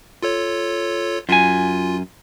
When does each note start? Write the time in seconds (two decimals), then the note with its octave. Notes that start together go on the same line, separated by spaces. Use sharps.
0.23 F4 A4 C#5
1.29 F#2 F4 G#5